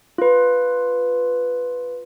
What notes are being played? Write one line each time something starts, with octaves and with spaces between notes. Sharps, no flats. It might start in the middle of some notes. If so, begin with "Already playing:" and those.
F4 B4